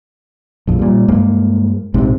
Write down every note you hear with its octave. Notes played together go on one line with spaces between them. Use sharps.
A#1 F2
A#2 G3
G2 G#3 A#3
A#1 G#2 C3